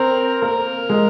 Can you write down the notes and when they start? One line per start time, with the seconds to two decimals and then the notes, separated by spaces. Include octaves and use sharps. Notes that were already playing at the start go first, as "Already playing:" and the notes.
Already playing: C4 A#4
0.41 A#3 A#4
0.90 G#3